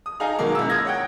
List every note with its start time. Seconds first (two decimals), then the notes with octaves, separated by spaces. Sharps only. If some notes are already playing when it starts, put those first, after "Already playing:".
0.06 D#6
0.20 D#4 G#4 A4 F5 G#5 A#5
0.39 B2 D#3 F#3 G#3 A#3
0.55 C#2 G#3 E4 E6
0.69 D#6 F6 G#6 A#6
0.85 C#5 F#5 G5